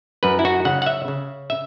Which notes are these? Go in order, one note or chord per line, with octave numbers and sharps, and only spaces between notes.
F#2 B4
E4
F#4
C#3 F#5
F#5
E5
C#3
E5